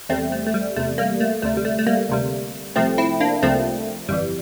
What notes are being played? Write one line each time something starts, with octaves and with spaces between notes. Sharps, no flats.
E2 C3 G3 A3 C4
A3
A3
G3
E2 C3 G3 A3
G3 A#3
A3
D2 C3 G3 A3
G3
A3
A3
G3 A#3
D2 C3 G3
C2 C3 F3 A3 C4
C4 E4
A#3 D4
C2 C3 F3 A3 C4
G1 F2 E3 G3